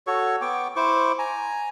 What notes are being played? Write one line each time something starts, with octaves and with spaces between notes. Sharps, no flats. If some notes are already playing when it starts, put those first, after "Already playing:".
F#4 A4 C#5 C#6
B3 G5 C#6 D6
E4 C5 C#6 D6
G#5 A#5